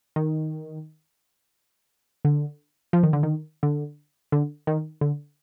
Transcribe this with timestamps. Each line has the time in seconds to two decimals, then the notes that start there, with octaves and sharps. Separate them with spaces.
0.16 D#3
2.25 D3
2.93 F3
3.03 D#3
3.13 D3
3.23 D#3
3.63 D3
4.32 D3
4.67 D#3
5.01 D3